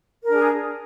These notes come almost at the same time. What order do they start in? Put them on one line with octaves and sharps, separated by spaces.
A#4 D4 G#4